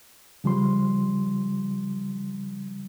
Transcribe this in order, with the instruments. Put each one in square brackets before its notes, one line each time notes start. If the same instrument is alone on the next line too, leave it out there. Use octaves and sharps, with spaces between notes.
[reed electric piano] C#3 F3 G3 C6